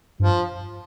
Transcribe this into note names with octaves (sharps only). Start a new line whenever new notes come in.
G2 F3